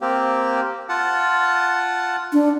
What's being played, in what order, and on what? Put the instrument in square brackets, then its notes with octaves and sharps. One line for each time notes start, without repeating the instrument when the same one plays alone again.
[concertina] A#3 C4 G4
F4 F#5 A5
[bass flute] D4